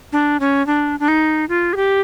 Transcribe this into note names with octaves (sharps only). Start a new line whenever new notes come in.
D4
C#4
D4
D4
D#4
F4
G#4
G4